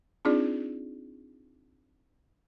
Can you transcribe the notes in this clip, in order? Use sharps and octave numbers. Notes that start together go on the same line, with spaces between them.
C4 D4 D#4 F4 G#4 D5